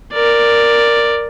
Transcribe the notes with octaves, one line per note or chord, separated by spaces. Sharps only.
A#4 D5